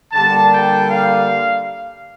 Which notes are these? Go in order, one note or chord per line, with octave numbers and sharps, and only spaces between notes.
D3 G3 A#3 A5
G5
F5